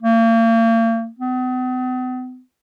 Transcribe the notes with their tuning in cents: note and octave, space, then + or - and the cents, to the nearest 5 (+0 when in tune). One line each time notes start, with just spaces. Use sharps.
A#3 -40
B3 +45